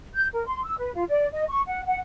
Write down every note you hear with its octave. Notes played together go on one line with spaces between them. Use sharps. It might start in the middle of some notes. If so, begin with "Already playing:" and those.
G6
A#4
C6
E6
B4
F4
D5
D#5
C#6
F#5
F#5